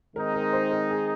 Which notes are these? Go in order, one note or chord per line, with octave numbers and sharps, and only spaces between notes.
D#3 G#3 C4 D#4 A#4
A#4
C5
A#4
G#4